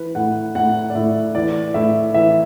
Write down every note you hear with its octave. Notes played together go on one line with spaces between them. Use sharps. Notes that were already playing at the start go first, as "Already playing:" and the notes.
Already playing: E3 B4
A2 F#5
A2 F#5
D5
A2 E5
E3 D5
A2 E5
E3 E5